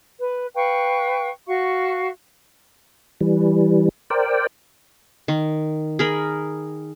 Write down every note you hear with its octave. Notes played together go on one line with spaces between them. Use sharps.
B4
B4 F5 G5 C#6
F#4 F5 C#6
E3 G3
A#4 C5 D5 G5
D#3
G#4 A#4 B5